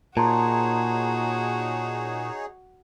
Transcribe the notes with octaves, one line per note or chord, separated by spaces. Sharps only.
A#2 D#4 F#4 G#4 C#5 A5 A#5 C6